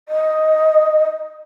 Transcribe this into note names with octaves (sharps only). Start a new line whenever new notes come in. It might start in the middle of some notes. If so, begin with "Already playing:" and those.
D#5